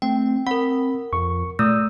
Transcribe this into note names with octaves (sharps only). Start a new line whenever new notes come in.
A3 C4 G5
C4 A#4 F#5 B5
F2 C#6
A#2 A3 D#6 E6